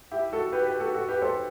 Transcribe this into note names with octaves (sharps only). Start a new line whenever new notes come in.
E4 G4
F#4 A4
G4 B4
G4 B4
F#4 A4
F#4 A4
G4 B4
A4 C5